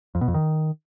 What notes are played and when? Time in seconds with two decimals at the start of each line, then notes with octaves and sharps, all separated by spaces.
0.15 F2
0.21 B2
0.28 F2
0.34 D#3